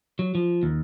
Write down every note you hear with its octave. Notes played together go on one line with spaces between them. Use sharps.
F#3
F3
D#2